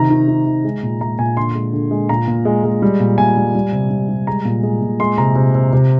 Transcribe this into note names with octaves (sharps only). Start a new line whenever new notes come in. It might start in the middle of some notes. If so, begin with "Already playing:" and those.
Already playing: C3 D#3 A#5
D#3
D#3
D#3
G#3
A#2
G#3 A#5
A#2 G#5
D3 C6
G#3
D3
G#3
A#2 A#5
A#2
G#3
G#3
G3
A#2
A#2 G#5
G3
G3
C3
G3
G3
G#3 A#5
A#2
G#3
A#2
G#3 C6
C3 A#5
C3
C3
C3